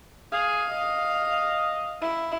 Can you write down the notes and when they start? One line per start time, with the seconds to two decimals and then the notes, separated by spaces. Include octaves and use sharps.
0.33 G#4 F5
0.71 D#5
2.01 E4